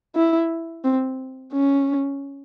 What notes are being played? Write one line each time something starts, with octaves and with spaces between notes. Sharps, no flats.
E4
C4
C#4